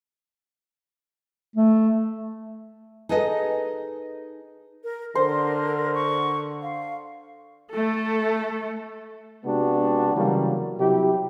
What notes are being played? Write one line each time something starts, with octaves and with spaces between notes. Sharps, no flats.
A3
D#4 G#4 A4 B4 D#5
A#4
D3 A#4 C5
C#6
F5
A3 A4
C3 G#3 B3 D4 F#4 G4
C#3 E3 F#3 G3 A#3
C3 F#3 E4 G4